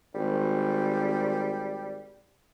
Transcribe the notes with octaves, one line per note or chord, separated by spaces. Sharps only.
G#1 G3